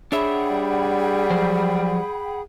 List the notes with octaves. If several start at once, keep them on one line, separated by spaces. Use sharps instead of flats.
D4 G#4 C#5 E5 F#5 G5 B5
G3
F3 F#3 C5